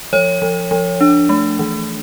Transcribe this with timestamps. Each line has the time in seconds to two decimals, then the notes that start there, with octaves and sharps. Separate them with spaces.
0.13 F3 C#5
0.42 F3
0.71 F3
1.01 D4
1.29 A3
1.59 E3